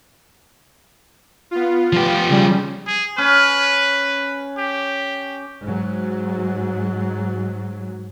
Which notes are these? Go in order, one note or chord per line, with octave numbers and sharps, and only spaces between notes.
B3 F4
F3 G4
C#3 G3
G#4
C#4 B4
G4
G#2 F#3